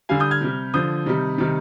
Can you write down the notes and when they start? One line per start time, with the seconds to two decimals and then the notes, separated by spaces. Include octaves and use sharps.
0.09 D3 G3 F5 G#5
0.20 D#6 G6
0.31 F6 G#6
0.41 C3 G3
0.74 D3 F3 D#6 G6
1.06 C3 D#3 G3
1.38 C3 D#3 G3